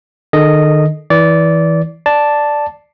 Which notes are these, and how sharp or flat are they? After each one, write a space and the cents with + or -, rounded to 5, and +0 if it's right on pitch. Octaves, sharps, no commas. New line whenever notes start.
D#3 -35 A4 -30 D#5 -5
E3 -20 D5 -20
D5 +0 A5 +0